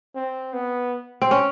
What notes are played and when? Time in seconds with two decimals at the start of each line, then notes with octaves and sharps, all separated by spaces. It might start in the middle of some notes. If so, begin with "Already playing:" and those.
0.15 C4
0.53 B3
1.22 C4
1.31 C#4